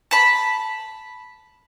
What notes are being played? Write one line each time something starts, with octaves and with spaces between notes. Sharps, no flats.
A5 B5